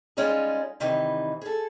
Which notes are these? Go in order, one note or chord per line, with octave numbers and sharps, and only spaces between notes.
G3 G#3 C#4 D#4 F4 G#4
C3 D#3 E3 G3 D#4
G#4 A4